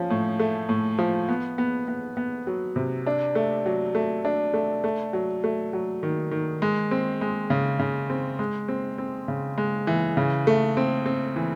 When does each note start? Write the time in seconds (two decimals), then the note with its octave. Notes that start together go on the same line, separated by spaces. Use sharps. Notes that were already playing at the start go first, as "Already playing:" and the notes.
Already playing: F3 C#4
0.10 A2
0.40 A3
0.69 A2
0.99 F3
1.29 B3
1.58 B3
1.88 B3
2.17 B3
2.47 F#3
2.76 C3
3.06 D4
3.35 A3
3.66 F#3
3.95 A3
4.25 D4
4.54 A3
4.84 A3
5.13 F#3
5.44 A3
5.73 F#3
6.03 D#3
6.31 D#3
6.62 G#3
6.91 C4
7.21 G#3
7.50 C#3
7.80 C#3
8.10 C4
8.39 G#3
8.68 C4
8.98 C4
9.28 C#3
9.58 G#3
9.87 E3
10.17 C#3
10.47 A3
10.77 C4
11.06 C4
11.36 E3